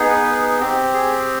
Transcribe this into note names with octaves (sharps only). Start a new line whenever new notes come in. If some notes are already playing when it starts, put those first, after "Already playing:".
Already playing: B3 D#4 G#4
B4
C4 G4
G#4